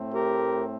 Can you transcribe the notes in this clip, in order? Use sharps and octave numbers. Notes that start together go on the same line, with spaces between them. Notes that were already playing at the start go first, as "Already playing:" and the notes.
Already playing: A2 A3 C4
G4 A#4